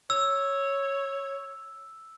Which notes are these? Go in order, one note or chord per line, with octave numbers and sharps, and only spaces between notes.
C#5 E6